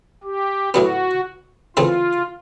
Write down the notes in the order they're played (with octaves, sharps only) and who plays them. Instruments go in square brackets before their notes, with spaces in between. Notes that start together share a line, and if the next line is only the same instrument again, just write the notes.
[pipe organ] G4
[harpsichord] A2 F#3 B3 [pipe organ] F#4
[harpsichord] C#3 E3 A3 C4 [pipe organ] F4